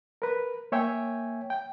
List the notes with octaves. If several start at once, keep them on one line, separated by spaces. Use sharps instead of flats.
A#4 B4
A#3 C#5 E5 G5 G#5
G5